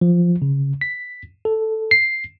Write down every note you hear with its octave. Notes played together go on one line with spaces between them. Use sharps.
F3
C#3
B6
A4
C7